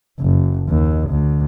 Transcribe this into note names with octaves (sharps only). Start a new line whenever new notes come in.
F#1
D#2
D2